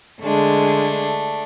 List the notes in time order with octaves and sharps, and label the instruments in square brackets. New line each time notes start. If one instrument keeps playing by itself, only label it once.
[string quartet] D3 G#3 [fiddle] A3 D4